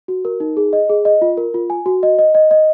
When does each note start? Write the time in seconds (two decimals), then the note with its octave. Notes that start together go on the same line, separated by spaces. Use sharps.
0.08 F#4
0.25 A#4
0.40 D#4
0.57 G#4
0.73 D#5
0.89 G#4
1.05 D#5
1.22 F4
1.37 A#4
1.54 F4
1.70 G#5
1.86 F#4
2.03 D#5
2.19 D#5
2.35 D#5
2.51 D#5